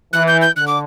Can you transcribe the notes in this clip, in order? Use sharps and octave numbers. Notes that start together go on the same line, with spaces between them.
E3 F#6
G6
G6
D3 F#6
D6